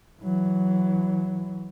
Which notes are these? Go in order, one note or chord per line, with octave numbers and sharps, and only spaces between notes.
E3 F#3